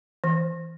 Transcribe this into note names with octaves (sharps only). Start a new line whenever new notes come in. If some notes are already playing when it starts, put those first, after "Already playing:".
E3